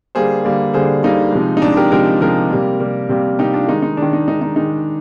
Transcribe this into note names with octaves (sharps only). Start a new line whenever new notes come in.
D3 G3 A#3 G#4 C5
D3 G3 A#3
D3 G3 A#3 G#4 C5
D3 G3 A#3 D#4
C3 F3 G#3
D#4
C3 F3 G#3 D4
G4 A#4
C3 F3 G#3 G4 A#4
C3 F3 G#3 G4 A#4
C3 G3 A#3
C3 G3 A#3
C3 G3 A#3
C3 G3 A#3 D#4 G4
D4 F4
D#3 G#3 D#4
D#4
D#3 G#3 D4
D#4
D#3 G#3 D#4
D#4
D#3 G#3 D#4